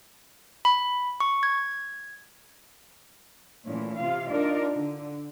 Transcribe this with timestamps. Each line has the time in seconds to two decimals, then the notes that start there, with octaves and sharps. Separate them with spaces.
0.65 B5
1.20 C#6
1.43 G#6
3.67 A#2 E3 A3 C#4
3.99 C3 F4 F5
4.30 D4 D#4 F4 A#4 D5
4.74 D3